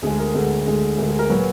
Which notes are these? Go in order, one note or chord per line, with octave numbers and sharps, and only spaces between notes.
D2 D3 G#3 G#4
A#4
D2 D3 G#3 G#4
D2 D3 G#3
D2 D3 G#3 A#4
G#4
A#4
A#2 F#3 B4